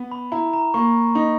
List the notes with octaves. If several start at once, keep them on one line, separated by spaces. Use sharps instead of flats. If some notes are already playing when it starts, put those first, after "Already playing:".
Already playing: B3
B5
E4 A#5
A#5
A#3 C#6
D#4